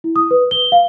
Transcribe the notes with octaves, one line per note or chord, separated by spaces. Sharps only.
E4
D#6
B4
G7
F5